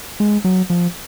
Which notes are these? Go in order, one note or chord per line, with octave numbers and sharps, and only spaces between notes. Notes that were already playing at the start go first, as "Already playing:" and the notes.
G#3
F#3
F3